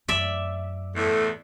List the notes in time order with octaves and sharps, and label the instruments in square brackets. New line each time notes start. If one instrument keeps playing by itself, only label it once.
[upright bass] F#2 [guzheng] D5 E5
[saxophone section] E2 A2 A3